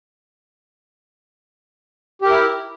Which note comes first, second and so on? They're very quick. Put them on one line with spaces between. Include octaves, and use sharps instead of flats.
G4 A#4 E4